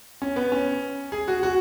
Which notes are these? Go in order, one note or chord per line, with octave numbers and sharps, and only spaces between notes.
C#4
B3
C#4
G#4
F#4
F#4